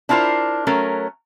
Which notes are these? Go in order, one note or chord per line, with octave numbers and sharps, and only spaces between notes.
D4 E4 F4 A#4 C5
F#3 A3 C#4 A#4